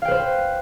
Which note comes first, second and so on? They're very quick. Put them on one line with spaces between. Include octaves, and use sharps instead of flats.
F5 G5 B4 C5